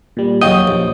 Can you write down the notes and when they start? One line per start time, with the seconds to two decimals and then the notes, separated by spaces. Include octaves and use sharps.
0.17 A#2 G3
0.42 D#2 C#3 F#3 C#5 D#5 G5
0.67 A#1